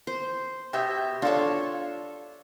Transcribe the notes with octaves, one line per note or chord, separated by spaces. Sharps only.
C5
B2 G4 E5
D4 F4 A4 C#5